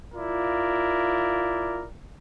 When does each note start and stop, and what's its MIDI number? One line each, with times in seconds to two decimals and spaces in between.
0.15 1.87 64
0.15 1.83 65
0.15 1.87 70
0.15 1.87 74